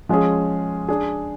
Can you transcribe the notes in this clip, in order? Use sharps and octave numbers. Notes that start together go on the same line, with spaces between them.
F3 G#3 C#4 G#4
D4 G#4